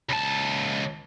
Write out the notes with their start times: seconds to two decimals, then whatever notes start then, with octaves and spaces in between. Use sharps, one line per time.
0.09 C#2 A5